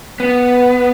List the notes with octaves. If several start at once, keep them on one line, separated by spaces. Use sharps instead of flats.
B3